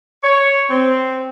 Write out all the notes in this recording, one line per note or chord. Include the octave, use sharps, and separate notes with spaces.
C#5
C4